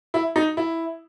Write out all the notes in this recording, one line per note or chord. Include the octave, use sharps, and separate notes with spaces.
E4
D#4
E4